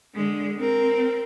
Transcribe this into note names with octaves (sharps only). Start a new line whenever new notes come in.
D3 G#3
C4 A#4